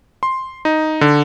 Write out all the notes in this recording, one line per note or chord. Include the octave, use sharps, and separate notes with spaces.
C6
D#4
D3